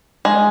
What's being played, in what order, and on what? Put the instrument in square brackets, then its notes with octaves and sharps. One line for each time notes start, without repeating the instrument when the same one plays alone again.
[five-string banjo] G#3